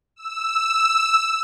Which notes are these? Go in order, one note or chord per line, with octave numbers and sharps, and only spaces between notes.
E6